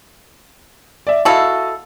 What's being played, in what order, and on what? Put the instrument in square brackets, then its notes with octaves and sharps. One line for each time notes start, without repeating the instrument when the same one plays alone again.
[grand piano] D5 E5
[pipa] E4 A4 [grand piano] F#4 D#5 F5